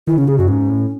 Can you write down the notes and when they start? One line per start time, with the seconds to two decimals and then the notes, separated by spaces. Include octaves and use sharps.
0.07 D#3 E4
0.17 C#3 C#4
0.28 C#3 G#4
0.38 F#2 F#4
0.48 G#2 C#4
0.70 A2